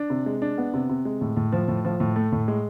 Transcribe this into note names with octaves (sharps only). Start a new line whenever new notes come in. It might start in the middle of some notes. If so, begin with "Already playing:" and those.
Already playing: D4
C3
G#3
D4
B3
C3
C3
G#3
A2
A2
F3
A2
F3
A2
A3
A2
G#3